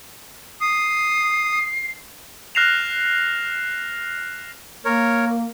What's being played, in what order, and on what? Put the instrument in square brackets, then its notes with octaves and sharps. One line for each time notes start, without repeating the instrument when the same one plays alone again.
[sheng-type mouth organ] D#6 [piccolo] C7
[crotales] F6 F#6 A#6 C7 E7 F7
[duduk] A#3 [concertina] A#4 C#5